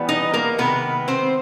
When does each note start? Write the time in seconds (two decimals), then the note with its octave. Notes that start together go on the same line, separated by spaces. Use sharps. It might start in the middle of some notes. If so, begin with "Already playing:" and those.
Already playing: E3 G3 B3
0.09 D#4 D#5
0.33 A#3 A#4
0.58 C3 D#3 G#3 B3 B4
1.08 C4 C5